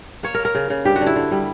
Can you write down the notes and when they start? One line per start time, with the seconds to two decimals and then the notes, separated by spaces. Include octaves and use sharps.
0.23 A#3 C#5
0.34 A#3 A#4
0.45 A#4
0.55 C#3
0.70 C#3
0.85 G2 G4
0.96 F#4
1.01 D3
1.07 E4
1.16 D3
1.31 G3